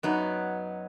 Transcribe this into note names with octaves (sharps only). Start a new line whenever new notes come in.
F#2 F#3 B3 D#4